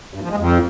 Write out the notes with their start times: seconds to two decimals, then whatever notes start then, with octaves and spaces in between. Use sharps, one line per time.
0.14 G2
0.22 F3
0.30 G#3
0.39 F2